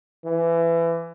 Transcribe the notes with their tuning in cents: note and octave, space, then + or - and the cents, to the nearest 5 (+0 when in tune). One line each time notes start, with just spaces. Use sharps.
E3 +25